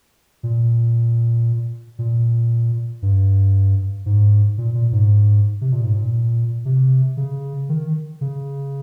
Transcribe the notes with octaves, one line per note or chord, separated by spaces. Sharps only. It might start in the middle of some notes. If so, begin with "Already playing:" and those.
A#2
A#2
G2
G#2
A#2
A#2
G#2
C3
A#2
G#2
A#2
C3
C#3
D#3
C#3